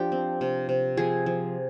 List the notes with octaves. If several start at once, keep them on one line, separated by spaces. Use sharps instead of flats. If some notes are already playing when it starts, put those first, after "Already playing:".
Already playing: F3 D4 G4
C4
C3
C3
F3 G#4
F3